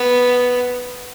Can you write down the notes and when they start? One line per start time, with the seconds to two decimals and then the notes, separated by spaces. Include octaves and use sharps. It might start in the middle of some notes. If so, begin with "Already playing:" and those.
Already playing: B3